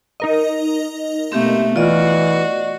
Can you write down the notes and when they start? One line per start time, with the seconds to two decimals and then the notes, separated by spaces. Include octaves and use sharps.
0.20 D#4 A#4 D#5
1.32 B2 A3 A#3 C4 G4 E5
1.76 E3 F4 F#4 D5 D#5